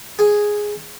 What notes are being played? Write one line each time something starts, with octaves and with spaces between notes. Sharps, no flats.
G#4